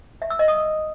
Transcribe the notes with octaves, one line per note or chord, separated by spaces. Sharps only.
E5
E6
D#5
D#6